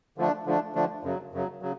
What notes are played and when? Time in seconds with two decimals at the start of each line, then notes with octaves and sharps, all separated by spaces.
0.18 D3 F3 A3 D4
0.46 D3 F3 A3 D4
0.75 D3 F3 A3 D4
1.03 F#2 C#3 F#3
1.33 F#2 C#3 F#3
1.62 C#3 F#3